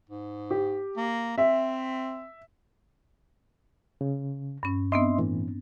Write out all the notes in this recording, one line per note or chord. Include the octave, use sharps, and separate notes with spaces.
G#2
G4
A#3
C4 E5
C#3
G2 C#4
B3 C4 D4 D#5 E5 C6
A2 E3